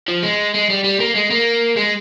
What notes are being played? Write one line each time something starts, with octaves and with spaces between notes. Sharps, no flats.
F3
G#3
G#3
G3
G3
A#3
G#3
A#3
G#3